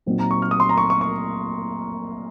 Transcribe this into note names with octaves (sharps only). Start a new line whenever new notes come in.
A#2 F#3 C4 D#4
A#5
C#6
F6
D#6
C6
A#5
C#6
C#6
C#6